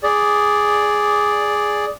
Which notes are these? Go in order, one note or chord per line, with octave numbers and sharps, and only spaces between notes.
G#4 D5